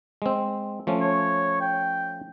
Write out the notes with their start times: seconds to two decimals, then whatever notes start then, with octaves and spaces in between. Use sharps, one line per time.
0.22 G#3 C4
0.87 F3 A3 C#4
1.01 C#5
1.61 G5